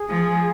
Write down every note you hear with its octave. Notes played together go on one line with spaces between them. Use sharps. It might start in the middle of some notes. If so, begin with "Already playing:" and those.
Already playing: G#4
F3